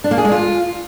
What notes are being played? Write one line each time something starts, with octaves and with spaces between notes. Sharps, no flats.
D4
A#3
G#4
G#3
F4